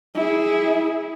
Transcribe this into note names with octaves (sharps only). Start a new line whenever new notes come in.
E4 G#4